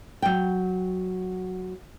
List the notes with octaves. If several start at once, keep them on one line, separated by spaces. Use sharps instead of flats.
F#3 G5